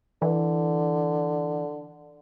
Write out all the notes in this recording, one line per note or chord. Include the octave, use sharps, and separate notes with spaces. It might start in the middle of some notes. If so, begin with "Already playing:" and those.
D3 E3